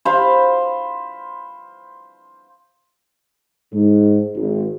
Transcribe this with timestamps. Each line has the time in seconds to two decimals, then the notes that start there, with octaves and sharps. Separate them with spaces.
0.05 C5 F5 B5
3.72 G#2
4.36 G#1